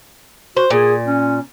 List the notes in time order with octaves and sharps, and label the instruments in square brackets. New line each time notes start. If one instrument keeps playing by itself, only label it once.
[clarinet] F#4 [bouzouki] C5
[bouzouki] A#2 [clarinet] G#4
[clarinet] C#4